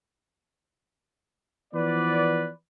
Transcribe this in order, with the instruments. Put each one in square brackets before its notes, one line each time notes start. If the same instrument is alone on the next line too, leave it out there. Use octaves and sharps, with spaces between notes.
[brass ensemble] E3 F3 B3 B4 D5